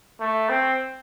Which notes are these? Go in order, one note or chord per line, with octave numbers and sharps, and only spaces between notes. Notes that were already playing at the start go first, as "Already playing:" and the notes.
A3
C4